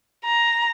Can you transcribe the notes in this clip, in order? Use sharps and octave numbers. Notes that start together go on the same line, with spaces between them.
A#5